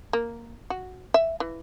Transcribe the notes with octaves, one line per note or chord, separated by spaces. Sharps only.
A#3
F#4
E5
E3